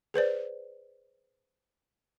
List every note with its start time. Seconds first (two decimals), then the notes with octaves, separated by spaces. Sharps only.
0.14 G#4 B4 C5 D5